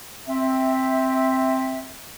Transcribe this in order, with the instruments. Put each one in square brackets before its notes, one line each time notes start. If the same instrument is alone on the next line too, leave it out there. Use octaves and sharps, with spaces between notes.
[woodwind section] C4 E5